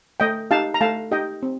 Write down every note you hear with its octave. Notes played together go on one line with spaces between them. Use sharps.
A3 D#5 G5
D#4 G4 F5 A5
A#5
A3 F5 A5
D#4 G4 D#5 G5
C4